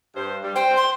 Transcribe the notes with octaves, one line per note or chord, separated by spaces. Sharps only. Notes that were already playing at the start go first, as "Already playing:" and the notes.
G2 C5
G3
C5 G5
C6